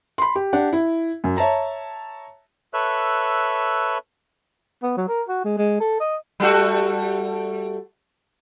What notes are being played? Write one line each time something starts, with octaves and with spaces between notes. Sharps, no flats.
B5 C6
G4
D4 G4 F#5
E4
F#2
C#5 E5 A5 A#5
A4 B4 C#5 E5 F#6
B3
F#3
A#4
F#4
G#3
G#3
A4
D#5
G3 A3 F#4